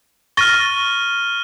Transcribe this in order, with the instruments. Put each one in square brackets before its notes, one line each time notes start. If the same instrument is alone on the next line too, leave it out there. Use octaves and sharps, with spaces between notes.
[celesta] C#6 A6 A#6 [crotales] F6 D#7 G7